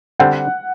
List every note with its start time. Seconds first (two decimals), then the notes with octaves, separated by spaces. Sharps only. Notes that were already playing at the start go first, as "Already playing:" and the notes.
0.20 D3 G3 C4 F#5